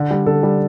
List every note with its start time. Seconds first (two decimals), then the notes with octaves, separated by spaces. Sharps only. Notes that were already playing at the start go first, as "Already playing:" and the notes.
Already playing: D3
0.11 G3
0.26 D3 A4
0.43 G3